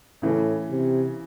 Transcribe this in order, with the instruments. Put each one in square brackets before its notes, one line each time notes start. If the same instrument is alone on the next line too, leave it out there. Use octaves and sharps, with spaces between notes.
[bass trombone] A2 [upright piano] C#3 E3
[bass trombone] C3